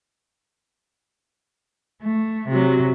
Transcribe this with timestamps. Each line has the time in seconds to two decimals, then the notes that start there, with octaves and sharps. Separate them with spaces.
2.02 A3
2.48 C3 F#3